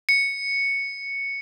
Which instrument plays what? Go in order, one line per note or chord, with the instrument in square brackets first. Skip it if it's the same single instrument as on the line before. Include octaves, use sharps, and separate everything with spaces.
[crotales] C#7